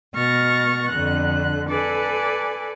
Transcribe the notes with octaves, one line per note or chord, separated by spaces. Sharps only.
B2 C#6 F6 A6 A#6
F2 D3 F#6
A4 B4 D5 G#5